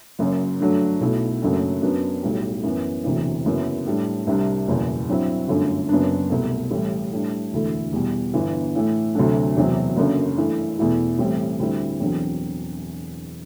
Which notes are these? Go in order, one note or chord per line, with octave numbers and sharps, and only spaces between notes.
F#1 F#2 F#3
G2 D3 F#3 A3 D4
B1 B2 A3 E4
F#1 F#2 F#3 A3 D4
F#2 F#3 B3 D4
B1 A2 G3
F#2 E3 B3
E1 D2 C3 E3
F#1 F#2 F#3 B3 E4
A2 G3 D4
C2 C3 G3 D4
F#1 E2 B2
G2 F#3 C4 E4
G1 F#2 D3 A3
F#1 F#2 F#3 B3 D4
C2 B2 A3
A1 A2 G3
A2 G3 D4
E1 D2 D3 A3 E4
E2 B2 G3
G1 G2 E3 B3
A2 E3 A3
D2 C3 F#3 A3 D4
E1 E2 C3 F#3 C4
F#1 F#2 D3
G2 E3 A3 E4
E2 B2 A3 E4
A1 A2 G3 C4
D2 D3 G3 C4 E4
E1 E2 D3 F#3 C4